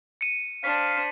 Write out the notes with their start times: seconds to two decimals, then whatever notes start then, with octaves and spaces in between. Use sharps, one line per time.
0.21 C#7 D#7
0.64 D4 C5 F5 B6